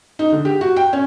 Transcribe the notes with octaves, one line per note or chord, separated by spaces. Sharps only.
D#4
D3
G4
F#4
G5
C#4